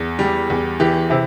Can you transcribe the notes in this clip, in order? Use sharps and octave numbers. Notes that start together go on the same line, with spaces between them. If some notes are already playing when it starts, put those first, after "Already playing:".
Already playing: E2
G3
E2
E3 G4
C3 E4